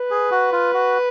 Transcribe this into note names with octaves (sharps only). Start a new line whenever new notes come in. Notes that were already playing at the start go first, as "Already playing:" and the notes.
Already playing: B4
G#4
F#4
F4
F#4